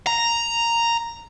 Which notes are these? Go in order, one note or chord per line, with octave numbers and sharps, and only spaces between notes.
A#5